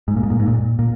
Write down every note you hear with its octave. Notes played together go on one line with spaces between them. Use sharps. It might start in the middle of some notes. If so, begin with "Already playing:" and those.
G#2
A#2
G#2
A#2
G#2
A#2
A#2